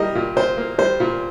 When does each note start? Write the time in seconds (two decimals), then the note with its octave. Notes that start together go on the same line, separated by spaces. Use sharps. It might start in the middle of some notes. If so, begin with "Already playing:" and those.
Already playing: G3 A#3 A#4 D#5
0.15 A#2
0.36 A#2 C5
0.57 A#3
0.78 G3 C5
1.00 A#2